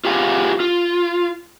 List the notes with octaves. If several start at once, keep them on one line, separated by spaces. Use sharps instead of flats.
F4 G4 G#4 F5
F4